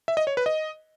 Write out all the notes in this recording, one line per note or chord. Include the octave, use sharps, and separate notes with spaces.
E5
D#5
C#5
B4
D#5